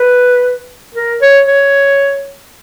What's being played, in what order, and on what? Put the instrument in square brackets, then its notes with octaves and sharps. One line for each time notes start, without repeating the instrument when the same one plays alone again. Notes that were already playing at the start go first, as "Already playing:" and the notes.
Already playing: [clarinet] B4
A#4
C#5
C#5